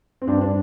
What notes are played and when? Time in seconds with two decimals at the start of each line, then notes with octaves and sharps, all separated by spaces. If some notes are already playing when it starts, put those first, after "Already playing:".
0.22 C4
0.27 G2 D4
0.41 D4